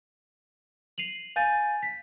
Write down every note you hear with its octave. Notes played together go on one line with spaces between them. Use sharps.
C7 D#7 F7 F#7
F5 G#5 G6 A6 D#7
B6